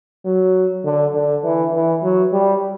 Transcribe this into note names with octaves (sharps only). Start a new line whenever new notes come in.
F#3
D3
D3
E3
E3
F#3
G3